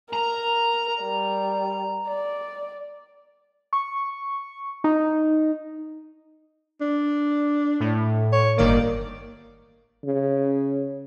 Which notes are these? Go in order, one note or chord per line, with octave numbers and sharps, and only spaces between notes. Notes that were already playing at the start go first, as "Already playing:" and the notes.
A#4 A#5
G3
D5
C#6
D#4
D4
A2
C#5
G1 D#3 A#3 D5
C#3